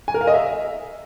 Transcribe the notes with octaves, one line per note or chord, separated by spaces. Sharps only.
G#5
A#4
F5
D#5
E5